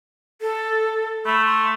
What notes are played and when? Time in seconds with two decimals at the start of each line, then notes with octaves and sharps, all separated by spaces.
0.41 A4
1.26 A3 B5
1.46 C6